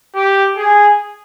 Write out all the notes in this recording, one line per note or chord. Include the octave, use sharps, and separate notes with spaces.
G4
G#4